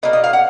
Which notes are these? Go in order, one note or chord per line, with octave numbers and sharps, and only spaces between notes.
B2 A#3 D#5
D#5
F5
F#5